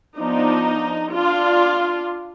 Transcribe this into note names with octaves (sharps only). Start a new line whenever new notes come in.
F3 B3 D4 D#4
D4 F4